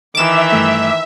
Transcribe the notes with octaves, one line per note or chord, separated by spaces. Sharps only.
D#3 E3 E5 D6 E7
G2 A3